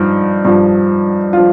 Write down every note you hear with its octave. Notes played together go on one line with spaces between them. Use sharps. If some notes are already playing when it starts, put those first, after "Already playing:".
Already playing: G2 F3 D#4
G2 F3
F3 F4